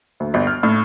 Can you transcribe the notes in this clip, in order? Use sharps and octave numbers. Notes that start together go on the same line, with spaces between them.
D2
G1
F6
A2